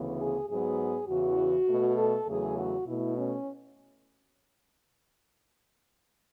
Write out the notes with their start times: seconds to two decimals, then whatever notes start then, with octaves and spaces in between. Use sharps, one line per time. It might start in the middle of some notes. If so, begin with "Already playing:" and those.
Already playing: D2 C#3 E3 B3
0.20 G#4
0.49 G#2 F#3 B3 G#4
1.09 E2 C#3 E3 F#4
1.69 B2 A3
1.98 A4
2.28 E2 C#3 F#3 A3 G#4
2.58 F#4
2.88 B2 A3 E4
3.18 C#4